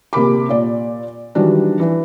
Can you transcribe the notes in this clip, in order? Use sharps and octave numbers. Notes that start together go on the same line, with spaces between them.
A#1 C3 A#4 B5 D6
A#2 D5
D#3 E3 F#3 G3 D4
E3